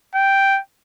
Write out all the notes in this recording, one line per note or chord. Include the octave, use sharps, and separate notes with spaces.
G5